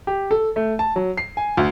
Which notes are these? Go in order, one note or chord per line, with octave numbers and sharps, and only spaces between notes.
G4
A4
A3
A5
F#3
C7
G#5
D2